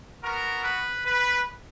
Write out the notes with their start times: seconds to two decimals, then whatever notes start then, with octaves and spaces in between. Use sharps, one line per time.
0.24 B3 F#4 A#4
0.64 B4
1.05 B4